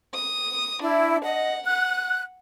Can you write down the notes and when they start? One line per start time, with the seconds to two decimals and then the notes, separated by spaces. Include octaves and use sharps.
0.14 D#6
0.82 D4 E4
1.23 D#5 F#5
1.66 F#5 F#6